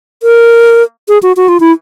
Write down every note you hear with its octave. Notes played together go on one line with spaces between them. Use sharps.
A#4
G#4
F#4
F#4
F4
E4